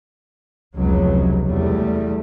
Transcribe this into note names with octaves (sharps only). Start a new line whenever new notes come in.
F1 C#2 B2 F#3
E2 G3 A3